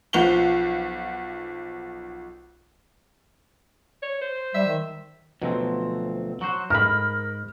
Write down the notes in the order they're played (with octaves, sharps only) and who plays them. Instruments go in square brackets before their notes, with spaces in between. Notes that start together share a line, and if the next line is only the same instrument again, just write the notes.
[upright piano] B1 F3 F#5 F7 G7
[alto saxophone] C#5
C5
[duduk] G3 [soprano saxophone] E5
[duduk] D#3
[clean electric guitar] D2 F3 C4 [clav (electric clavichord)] B2 F#3
[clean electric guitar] F#3 F#4 C5
[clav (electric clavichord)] G#2 [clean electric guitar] A#4 B5 [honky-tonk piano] F6